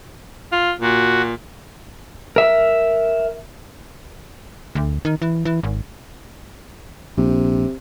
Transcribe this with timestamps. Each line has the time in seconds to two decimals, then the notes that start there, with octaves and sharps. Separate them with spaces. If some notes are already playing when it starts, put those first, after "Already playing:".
0.52 F4
0.81 A#2 F#4
2.36 A#4 E5
4.75 D2
5.05 D#3
5.22 E3
5.45 E3
5.63 G#1
7.18 A#1 C3